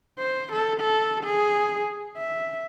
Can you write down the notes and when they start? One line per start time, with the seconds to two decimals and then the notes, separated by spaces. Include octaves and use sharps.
0.19 C5
0.52 A4
0.81 A4
1.24 G#4
2.18 E5